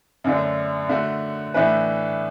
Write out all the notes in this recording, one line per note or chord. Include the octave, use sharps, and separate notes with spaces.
F#2 D3 A3 D4
D3 A3 F#4
A2 E3 A3 D4 B4